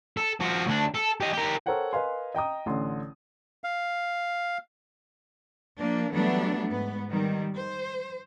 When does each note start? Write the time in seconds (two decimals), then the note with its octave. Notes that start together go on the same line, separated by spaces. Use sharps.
0.17 A4
0.41 F3 F#4
0.67 D2 D4
0.95 A4
1.21 G4 D#5
1.33 G4 A#4
1.66 A4 A#4 C5 C#5 F#5 G5
1.93 A#4 B4 D#5 F5 G#5 C6
2.35 D#5 G5 A#5 D#6
2.66 A1 D3 C6
3.64 F5
5.77 F3 A#3 D4
6.11 E3 F#3 G3 A3 B3 D4
6.69 G#2 B3
7.10 D#3 G3
7.55 C5